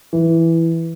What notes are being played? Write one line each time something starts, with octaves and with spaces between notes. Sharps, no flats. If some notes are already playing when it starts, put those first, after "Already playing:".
E3